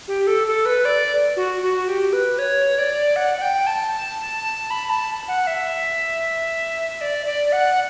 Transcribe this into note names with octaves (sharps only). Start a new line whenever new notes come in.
G4
A4
A4
B4
D5
F#4
F#4
G4
B4
C#5
D5
F#5
F#5
G5
A5
B5
A5
F#5
E5
D5
D5
F#5